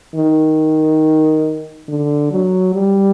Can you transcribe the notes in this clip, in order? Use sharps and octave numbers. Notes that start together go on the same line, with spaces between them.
D#3
D3
F#3
G3